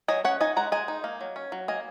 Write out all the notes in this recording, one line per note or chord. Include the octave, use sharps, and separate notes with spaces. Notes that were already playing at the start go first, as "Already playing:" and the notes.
F#3 D#5 G#5
C#4 C#5 F#5
D#4 D#5 G#5
G#3 F#5 A#5
G#3 D#5 G#5
D#4
A#3
F#3
C#4
F#3
A#3 D#5 G#5